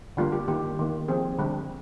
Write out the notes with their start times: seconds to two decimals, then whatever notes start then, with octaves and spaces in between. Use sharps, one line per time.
0.17 D3 G3 A#3 F4
0.32 G4
0.48 D#3 A#3 G4
0.79 D#3 A#3
1.08 F3 C4 G#4
1.38 D3 G3 C4